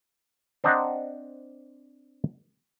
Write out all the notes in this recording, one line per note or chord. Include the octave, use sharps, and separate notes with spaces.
C4 D4 C5 D#5 F#5 A#5